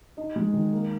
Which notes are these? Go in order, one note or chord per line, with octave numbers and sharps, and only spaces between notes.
D#4 D#5
G#3
D#3
A#3